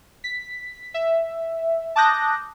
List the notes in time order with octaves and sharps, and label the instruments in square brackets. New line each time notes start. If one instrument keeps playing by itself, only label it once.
[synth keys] B6
E5
A5 D6 D#6 F#6 G6 A#6